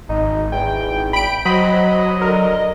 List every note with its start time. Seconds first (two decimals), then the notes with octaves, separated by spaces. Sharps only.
0.09 G#1 D#4
0.52 E2 G5
1.13 G5 B5 D7
1.45 F#3 F#4 C5 D#5 B5
2.22 D3 A#4